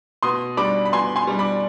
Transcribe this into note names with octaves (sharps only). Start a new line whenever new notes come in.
B2 C6 D#6
G3 D4 B5 D6
B5
B2 G#5 C6
G#5 C6
G3 D4
B5 D6